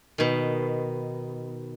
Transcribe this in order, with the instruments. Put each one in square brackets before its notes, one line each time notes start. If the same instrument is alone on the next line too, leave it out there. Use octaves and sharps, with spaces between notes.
[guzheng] B2 D#3